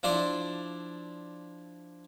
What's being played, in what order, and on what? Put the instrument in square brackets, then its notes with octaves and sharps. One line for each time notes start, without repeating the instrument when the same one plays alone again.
[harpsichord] F3 D4 E4 D5 C6